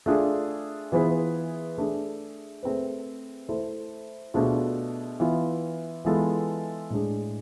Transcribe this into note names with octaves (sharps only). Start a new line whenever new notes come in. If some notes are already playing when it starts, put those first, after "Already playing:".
A3 D4 F4 G#4
E3 B3 F4 G#4 B4
A3 D4 G#4
A3 C4 G#4 B4
A3 E4 A4 C5
B2 A3 D4 F4 G#4
E3 B3 F4
E3 G#3 B3 F4 A4
A2 G#3 D4 G#4